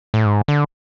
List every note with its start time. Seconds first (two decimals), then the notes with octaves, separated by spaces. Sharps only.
0.14 A2
0.26 G#2
0.48 D3